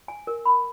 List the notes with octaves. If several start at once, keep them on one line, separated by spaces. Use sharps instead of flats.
G#5
A#4
B5